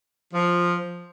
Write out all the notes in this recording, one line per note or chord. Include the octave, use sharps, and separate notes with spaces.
F3